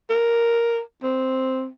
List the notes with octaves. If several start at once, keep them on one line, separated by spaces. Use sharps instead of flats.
A#4
C4